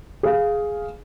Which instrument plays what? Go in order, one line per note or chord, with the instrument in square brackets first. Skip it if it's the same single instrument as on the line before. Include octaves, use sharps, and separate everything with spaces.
[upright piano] G#4 F5